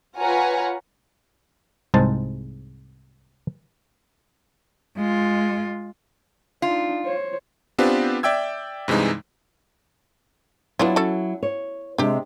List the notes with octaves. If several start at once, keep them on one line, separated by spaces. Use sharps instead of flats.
F4 B4 C#5 F#5 G#5 A#5
C2 G#2 G#3 C5 A5
G#3 F4
D4 D#4 F4
C5 C#5
B3 C4 D4 F4 G4 B4
D5 E5 G5 E6 G#6
G2 C3 E3 G#3 D#4
F#3 B3 D4 E4 F4
C#4 F#4 A4
C#5
C3 G#3 D4 G4